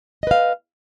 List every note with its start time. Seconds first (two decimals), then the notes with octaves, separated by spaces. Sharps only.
0.23 D#5
0.27 B4
0.31 F5